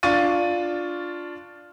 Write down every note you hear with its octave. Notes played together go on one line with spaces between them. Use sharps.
D4 F4 C#6 A6 D#7